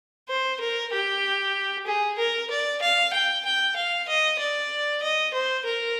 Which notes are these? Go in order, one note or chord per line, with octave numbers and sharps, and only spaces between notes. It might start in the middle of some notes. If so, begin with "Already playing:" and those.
C5
A#4
G4
G#4
A#4
D5
F5
G5
G5
F5
D#5
D5
D#5
C5
A#4